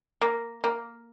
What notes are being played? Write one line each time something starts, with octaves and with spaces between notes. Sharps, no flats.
A#3
A#3